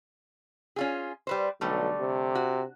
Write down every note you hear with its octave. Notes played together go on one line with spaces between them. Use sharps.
C#4 F4 G#4
G3 B4 C5
B1 D3 G3 A3
C3
F#4